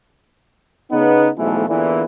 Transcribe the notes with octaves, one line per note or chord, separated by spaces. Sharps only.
C#3 B3 D#4
B1 G#2 B2 E3 F3 A3
E2 A#2 D3 E3